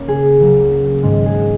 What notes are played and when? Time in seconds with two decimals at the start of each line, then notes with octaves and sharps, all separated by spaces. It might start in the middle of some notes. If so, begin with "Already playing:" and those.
Already playing: C#3 A#3 C#4
0.08 G#4
0.40 C#2 C#3 F#3 A#3
1.03 G#2 D#3 G#3 C#4
1.26 G#4
1.34 F#4